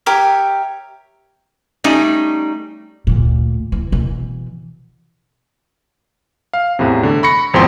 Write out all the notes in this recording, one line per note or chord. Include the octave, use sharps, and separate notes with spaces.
G4 A#4 C#5 E5
G3 A3 C#4 D#4
D2 A#2
E3
B2 E3
F5
E2 A2 C3
D3
B5 C#6 A#6 C#7
G#1 E2 F3 C4 G5 C6